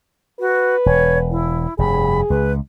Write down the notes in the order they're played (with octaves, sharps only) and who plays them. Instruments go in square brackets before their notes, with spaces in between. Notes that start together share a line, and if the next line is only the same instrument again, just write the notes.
[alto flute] F#4 [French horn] B4
[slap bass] E1 [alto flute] C#5
[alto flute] E4
[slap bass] F1 G2 [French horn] G#4 [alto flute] B5
[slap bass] C#2 [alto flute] B4